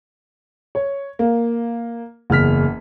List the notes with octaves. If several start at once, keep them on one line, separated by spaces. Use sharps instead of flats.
C#5
A#3
F#1 E2 F6 B6